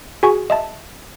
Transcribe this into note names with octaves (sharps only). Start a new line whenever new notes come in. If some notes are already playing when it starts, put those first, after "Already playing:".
F#4 G#4 G#5 C#6
D#5 E5 A5